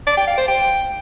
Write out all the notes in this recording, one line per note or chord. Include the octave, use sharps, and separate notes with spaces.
D5
G5
F5
C5
G5